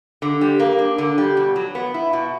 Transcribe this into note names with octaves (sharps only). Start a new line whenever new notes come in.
D3
G3
A#3
D4
D3
G3
B2
F#3
B3
E4
B2